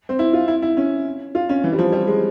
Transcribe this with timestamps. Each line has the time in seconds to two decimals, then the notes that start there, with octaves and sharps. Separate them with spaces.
0.09 C4
0.19 E4
0.33 F4
0.48 E4
0.62 E4
0.77 C#4
1.35 F4
1.49 C#4
1.64 E3
1.72 G3
1.79 F3
1.92 G3
2.07 G#3